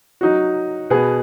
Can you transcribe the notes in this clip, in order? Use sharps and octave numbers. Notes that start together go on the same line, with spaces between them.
F#3 D#4 F#4
B2 B3 G#4